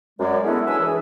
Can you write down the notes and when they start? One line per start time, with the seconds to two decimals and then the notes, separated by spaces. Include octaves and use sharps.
0.20 F#2 G#3 D5
0.44 G#3 A3 B3 C#4 D4 E4
0.66 C#3 E3 D4 E5 G#5 E6
0.80 E3 G#4